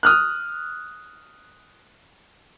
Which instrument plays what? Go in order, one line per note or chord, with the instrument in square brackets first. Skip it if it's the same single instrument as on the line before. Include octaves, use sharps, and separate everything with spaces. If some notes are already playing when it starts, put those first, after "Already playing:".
[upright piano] D#6 F6 F#6